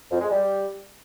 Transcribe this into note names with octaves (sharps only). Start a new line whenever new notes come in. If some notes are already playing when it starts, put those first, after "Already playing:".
F2
G#3
G3